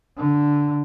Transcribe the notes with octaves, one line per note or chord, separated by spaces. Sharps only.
D3